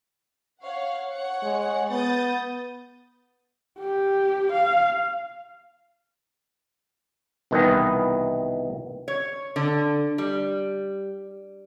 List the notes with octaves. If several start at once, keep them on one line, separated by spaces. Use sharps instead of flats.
C#5 F5 F#5
C#5 F#5 C#7
G#3
B3 D#6 G6 A6
G4
F5
C2 B2 D#3 E3 B3 D#5
C#5
D3
G3